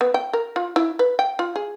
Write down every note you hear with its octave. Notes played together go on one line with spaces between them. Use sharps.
B3
G5
A#4
F4
E4
B4
G5
F4
G#4